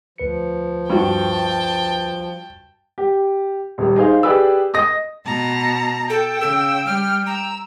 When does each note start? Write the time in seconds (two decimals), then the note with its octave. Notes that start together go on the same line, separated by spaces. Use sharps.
0.18 D2 F3 B4 C#7
0.90 G2 F#4 G5 A5
2.98 G4
3.78 D#1 G3
3.96 D#4 G#4 C5 F5
4.23 G4 G#4 B4 D5 E6
4.74 D#5 D#6 A#6
5.25 B2 A5 A#5
6.10 A4 G5
6.41 C#3 E6
6.86 G3 F6
7.27 A#5 E6